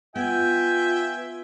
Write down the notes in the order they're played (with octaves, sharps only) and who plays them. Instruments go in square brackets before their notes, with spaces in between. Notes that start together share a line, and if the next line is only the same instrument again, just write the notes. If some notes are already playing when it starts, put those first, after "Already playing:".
[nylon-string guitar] B3 [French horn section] F4 [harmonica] E5 G5 G#5